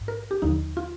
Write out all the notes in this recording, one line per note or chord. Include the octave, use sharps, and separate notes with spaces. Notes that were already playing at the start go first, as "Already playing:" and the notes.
Already playing: A#1 G#2
A#4
G4
D#2 D3 F3 D#4
F4